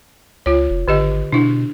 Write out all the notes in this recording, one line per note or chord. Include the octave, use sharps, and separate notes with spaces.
C#2 F4 C#5
F1
G#1 D3 G4 D#5
B2 D4 E4